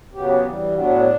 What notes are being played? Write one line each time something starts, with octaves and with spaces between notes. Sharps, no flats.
C#3 F#3 B3 G4
G4
G2 E3 G3
A2 F#3 B3 D4